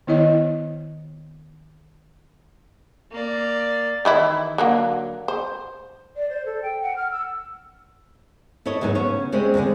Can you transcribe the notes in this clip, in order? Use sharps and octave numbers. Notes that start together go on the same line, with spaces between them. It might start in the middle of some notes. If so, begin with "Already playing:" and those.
D#3 B3 E4 C#5 D#5
A#3 D5
D#3 E3 E4
D3 F#3 A#3
C5
D5
C5
A4
G5
F#5
F6
E6
E4 A4 C#5 D#5
E2 G#2 F#3 A3 B3
C#3 B3 C#4 C#5
G3 G#3 C4 C#4 G#4 D#5
E2 D3 F#3 G#3